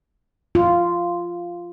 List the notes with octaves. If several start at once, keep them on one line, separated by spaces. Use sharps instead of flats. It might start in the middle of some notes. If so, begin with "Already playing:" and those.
F4